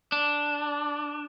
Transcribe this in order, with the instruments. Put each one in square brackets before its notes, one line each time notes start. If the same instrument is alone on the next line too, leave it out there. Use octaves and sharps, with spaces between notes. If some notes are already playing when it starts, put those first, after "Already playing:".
[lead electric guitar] D4